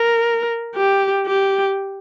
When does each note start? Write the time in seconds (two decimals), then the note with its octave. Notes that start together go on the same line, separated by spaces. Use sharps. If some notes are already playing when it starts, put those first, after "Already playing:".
Already playing: A#4
0.75 G4
1.26 G4